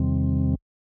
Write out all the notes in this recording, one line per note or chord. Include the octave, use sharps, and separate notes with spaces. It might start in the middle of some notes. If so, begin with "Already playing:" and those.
Already playing: E2 C3 D#3 G3 C4